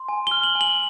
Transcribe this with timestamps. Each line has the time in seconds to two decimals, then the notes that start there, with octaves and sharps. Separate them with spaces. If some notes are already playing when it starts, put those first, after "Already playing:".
Already playing: C6
0.09 G#5
0.27 F6 G7
0.43 F#7
0.55 G#5
0.61 F#7